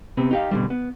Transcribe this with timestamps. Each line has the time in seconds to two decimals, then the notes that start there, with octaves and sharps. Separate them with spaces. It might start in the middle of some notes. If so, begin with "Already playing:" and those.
0.17 C3 B3 C4
0.31 D#4 G4 F5
0.51 B2 D3 G3
0.70 B3